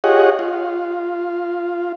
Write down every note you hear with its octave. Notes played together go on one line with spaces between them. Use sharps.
F4 G4 G#4 C#5 D#5 F#5
F4